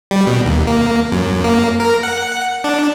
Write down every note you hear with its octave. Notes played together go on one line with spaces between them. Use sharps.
G3
B2
D#2
A#3
F#2
A#3
A#4
F#5
D4